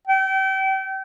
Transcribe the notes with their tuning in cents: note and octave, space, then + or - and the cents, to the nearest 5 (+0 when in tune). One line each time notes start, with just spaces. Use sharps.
G5 -30